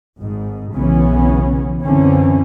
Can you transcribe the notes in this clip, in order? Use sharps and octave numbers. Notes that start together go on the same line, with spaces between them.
G#1 G#2
B1 C#3 E3 B3 C#4
F#2 D3 E3 C4 C#4